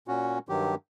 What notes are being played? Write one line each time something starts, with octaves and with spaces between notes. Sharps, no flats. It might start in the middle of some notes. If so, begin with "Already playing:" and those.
A#2 C#4 F#4
G2 D#3 F#3 G4